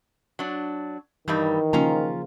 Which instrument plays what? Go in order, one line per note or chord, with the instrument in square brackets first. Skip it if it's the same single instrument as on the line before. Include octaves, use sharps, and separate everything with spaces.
[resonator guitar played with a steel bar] F#3 D4
[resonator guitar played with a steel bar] G2 G3 D#4 [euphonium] D#3 [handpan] E3
[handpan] C#3 F3 A#3 [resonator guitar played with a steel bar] C#4 F4 A#5